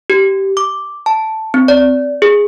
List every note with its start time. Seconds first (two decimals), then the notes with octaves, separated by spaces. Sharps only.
0.10 G4
0.57 D6
1.06 A5
1.54 C4
1.68 D5
2.22 G#4